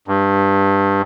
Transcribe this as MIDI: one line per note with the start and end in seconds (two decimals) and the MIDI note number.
0.08 1.02 43